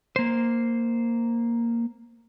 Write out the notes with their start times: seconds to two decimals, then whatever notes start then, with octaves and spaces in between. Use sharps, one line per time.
0.16 A#3 C5